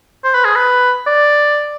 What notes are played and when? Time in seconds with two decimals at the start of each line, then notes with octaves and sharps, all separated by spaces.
0.24 C5
0.34 B4
0.45 G#4
0.55 B4
1.07 D5